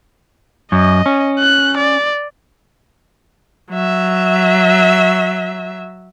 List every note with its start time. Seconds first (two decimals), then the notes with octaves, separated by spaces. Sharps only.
0.72 F#2 D#5
1.06 C#4
1.39 F#6
1.77 D5
3.71 F#3 E5